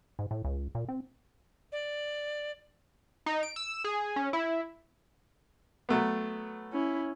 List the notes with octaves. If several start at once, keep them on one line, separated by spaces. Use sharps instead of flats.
G#2
A2
C#2
A#2
C4
D5
D#4
D7
E6
G#4
C#4
E4
F#3 A3 B3
C#4 E4